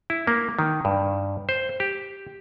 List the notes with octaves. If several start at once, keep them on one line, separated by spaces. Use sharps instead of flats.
E4
A#3
D#3
G2
C5
G4